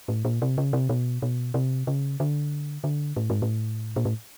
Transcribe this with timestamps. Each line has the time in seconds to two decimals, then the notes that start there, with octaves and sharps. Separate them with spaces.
0.08 A2
0.25 A#2
0.42 C3
0.58 C#3
0.73 C3
0.89 B2
1.22 B2
1.54 C3
1.87 C#3
2.20 D3
2.84 D3
3.16 A2
3.30 G#2
3.42 A2
3.96 A#2
4.05 A2